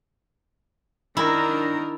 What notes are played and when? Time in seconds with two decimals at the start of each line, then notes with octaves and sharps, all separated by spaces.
1.17 D#3 D4 E4 A#4 A#5